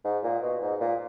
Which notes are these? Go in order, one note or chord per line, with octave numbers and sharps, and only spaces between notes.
G#2
A#2
B2
G#2
A#2